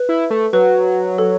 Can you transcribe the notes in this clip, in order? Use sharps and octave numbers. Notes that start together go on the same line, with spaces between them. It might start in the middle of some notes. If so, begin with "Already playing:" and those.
Already playing: B4
E4
A3
F#3 B4
A4